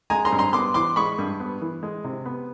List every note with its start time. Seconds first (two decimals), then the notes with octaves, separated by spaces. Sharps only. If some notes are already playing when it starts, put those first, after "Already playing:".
0.10 G#3 G#5 A#5
0.25 A#5 C6
0.32 G2
0.39 A#5 C6
0.53 B3 C6 D6
0.74 E3 C6 D6
0.96 G#3 B5 C#6
1.19 G2
1.40 B3
1.61 E3
1.83 G#3
2.04 C3
2.26 B3